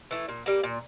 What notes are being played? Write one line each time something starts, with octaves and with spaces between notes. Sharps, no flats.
E3 A3
A#2
G3 A#3
A#2